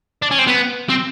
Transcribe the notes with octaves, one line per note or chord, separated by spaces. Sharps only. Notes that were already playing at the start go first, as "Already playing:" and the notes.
D4
C#4
C4
B3
C4